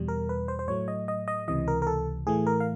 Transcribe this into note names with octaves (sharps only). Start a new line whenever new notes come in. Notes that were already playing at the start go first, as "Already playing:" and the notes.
Already playing: E2 B2 G3
A#4
B4
C5
C5
A2 F#3 A3 C#5
D#5
D#5
D#5
C#2 C3 E3 D#5
A#4
A#4
A4
A2 E3 A3 G#4
A#4
F5